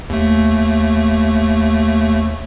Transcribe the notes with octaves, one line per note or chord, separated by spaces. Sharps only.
D#2 A3